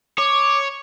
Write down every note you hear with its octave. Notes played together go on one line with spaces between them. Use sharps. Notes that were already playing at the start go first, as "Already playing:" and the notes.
C#5 D6